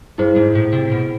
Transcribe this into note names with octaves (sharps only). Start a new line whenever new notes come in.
G2 E4 G#4 C5
G#2
A2
C3
B2